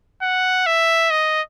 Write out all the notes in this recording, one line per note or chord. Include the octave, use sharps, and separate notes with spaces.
F#5
E5
D#5